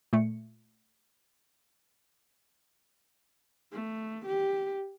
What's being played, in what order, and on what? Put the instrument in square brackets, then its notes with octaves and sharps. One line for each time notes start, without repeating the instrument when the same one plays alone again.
[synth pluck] A#2 A3 C#7
[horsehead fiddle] A3
G4